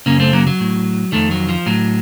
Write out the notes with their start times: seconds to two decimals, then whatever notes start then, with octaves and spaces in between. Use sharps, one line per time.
0.06 F#2 C#3 A#3 C#4
0.20 A3 C4
0.33 F#3 A#3
0.47 F#3
0.60 A2
1.12 F2 D#3 A3
1.31 F#3
1.49 F3
1.66 A2 F#3